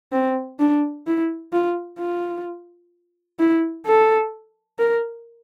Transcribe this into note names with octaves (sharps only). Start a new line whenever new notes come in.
C4
D4
E4
F4
F4
E4
A4
A#4